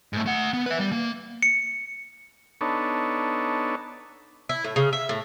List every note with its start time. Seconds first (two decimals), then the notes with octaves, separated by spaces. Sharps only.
0.13 G#2 A3
0.26 A3 F#5
0.53 B3
0.66 B4 E5
0.79 G3
0.92 A#3
1.43 C#7
2.61 B3 D4 D#4 A4 C#5
4.49 E4
4.64 A2
4.76 C#3
4.93 E5
5.09 A2